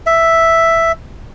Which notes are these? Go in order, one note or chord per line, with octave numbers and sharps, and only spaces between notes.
E5